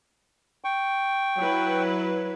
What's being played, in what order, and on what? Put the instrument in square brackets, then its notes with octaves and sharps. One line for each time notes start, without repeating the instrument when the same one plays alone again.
[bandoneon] G5 C#6
[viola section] F#3 E4 B4